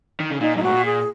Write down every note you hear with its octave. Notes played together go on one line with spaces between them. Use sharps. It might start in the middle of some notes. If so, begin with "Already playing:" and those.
D#3
C#3
A#2 D#4
F#2
D#4
G#2 F#4
A#2
G#4